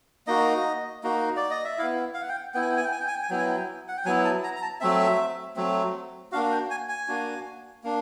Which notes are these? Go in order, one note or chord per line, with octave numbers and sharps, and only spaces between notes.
A#3 D#4 F#4 D#5
A#3 D#4 F#4
D5
D#5
E5
B3 E4 F5
F5
F#5
G5
B3 E4 G5
G#5
G5
G#5
G5
G#5
G5
G#5
G5
G#5
F#3 B3 E4 G5
G#5
G5
F#5
G5
F#3 B3 E4 G#5
A5
A#5
A#5
A5
F#3 A3 C4 E5
F#3 A3 C4
A#3 D4 F#4 F5
G5
G#5
G#5
A#3 D4 F#4
A#3 D4